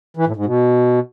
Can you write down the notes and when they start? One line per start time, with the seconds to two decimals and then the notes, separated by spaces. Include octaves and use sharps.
0.17 E3
0.26 A2
0.36 G#2
0.46 B2